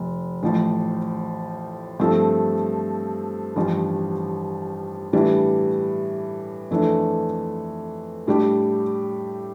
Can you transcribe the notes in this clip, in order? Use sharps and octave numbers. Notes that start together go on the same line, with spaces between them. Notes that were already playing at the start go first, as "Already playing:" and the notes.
Already playing: F1
A1 A2 F3
G2 F3 A3 C4
A1 G2 F3
A2 E3 G3 D4
F2 E3 A3 D4
A2 G3 D4 G4